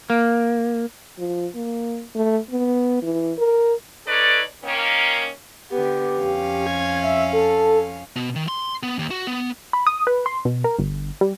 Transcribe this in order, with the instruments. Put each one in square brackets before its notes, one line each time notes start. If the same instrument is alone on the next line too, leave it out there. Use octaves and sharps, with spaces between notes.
[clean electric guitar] A#3
[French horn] F3
A#3
A3
B3
E3
A#4
[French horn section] D#4 A4 B4 C#5 D5
D#3 A#3 C#4
[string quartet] D3 B3 [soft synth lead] G4
[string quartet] F2 C#4 F5
[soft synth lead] G#6
E5
A4
[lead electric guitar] B2
D#3
C6
B3
D#2
F#4
B3
[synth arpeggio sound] B5
D#6
B4
C6
B2
A#4
G1
G3